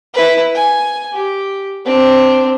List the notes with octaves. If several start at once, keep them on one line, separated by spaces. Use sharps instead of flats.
E4 B4
G#5
G4
C4 D4